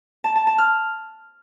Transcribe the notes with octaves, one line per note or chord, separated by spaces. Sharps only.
A5
A5
A5
F6